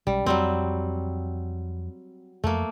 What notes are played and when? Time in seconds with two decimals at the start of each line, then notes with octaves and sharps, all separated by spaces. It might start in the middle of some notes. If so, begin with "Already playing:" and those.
0.07 B1 G3 G#3 C#4
0.26 F2 F#3 G3 C4
2.44 F2 F3 F#3 A3 A#3